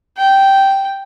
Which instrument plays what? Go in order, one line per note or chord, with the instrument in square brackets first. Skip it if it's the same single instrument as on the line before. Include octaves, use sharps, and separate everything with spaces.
[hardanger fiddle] G5